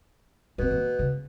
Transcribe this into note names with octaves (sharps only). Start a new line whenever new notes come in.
B2 E3 C4
A#3
C#3